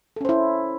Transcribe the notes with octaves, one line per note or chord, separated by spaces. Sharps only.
C#4 E4 A4 C5